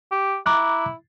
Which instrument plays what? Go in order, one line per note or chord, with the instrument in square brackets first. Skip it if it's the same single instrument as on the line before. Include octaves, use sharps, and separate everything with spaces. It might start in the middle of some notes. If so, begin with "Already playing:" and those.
[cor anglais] G4
[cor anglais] E4 [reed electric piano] A#5 D6 F#6